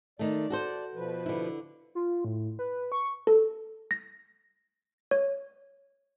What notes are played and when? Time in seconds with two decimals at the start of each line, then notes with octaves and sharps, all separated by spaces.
0.19 D#3 A3 D5
0.50 F#4 A4 C5
0.95 B2 F3 B4
1.26 D3 E4
1.95 F4
2.25 A2
2.59 B4
2.92 C#6
3.27 A4
3.91 A#6
5.11 C#5